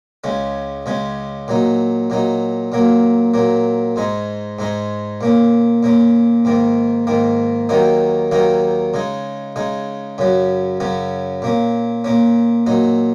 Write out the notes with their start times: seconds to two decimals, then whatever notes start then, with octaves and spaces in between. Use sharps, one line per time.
0.24 C#2 C#3 G#3 C#4
0.86 C#2 C#3 G#3 C#4
1.48 A#2 F#3 D#4
2.10 A#2 F#3 D#4
2.72 A#2 F#3 A#3
3.34 A#2 F#3 A#3
3.96 G#2 G#3 D#4
4.59 G#2 G#3 D#4
5.21 A#2 A#3 C#4
5.83 A#2 A#3 C#4
6.45 G#2 D#3 A#3
7.07 G#2 D#3 A#3
7.69 D#2 D#3 F#3 A#3 D#4
8.31 D#2 D#3 F#3 A#3 D#4
8.94 C#3 G#3 D#4
9.56 C#3 G#3 D#4
10.18 F#2 C#3 F#3 C#4
10.80 F#2 C#3 F#3 C#4
11.42 A#2 A#3 C#4
12.04 A#2 A#3 C#4
12.66 A#2 F#3 D#4